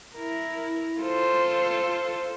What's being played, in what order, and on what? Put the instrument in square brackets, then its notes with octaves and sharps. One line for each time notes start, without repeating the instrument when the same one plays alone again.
[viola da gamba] E4 A#4
F4 A4 C5